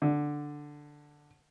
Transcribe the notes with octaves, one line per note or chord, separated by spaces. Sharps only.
D3